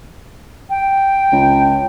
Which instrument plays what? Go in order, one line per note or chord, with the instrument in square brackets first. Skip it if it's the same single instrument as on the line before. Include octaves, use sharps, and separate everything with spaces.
[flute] G5
[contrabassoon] C#2